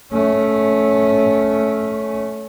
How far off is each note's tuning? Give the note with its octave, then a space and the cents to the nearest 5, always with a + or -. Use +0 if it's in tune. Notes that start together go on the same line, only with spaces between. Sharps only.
A3 -10 C#4 +0